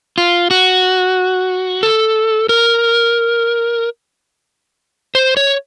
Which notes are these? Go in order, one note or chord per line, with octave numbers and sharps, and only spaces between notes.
F4
F#4
A4
A#4
C5
C#5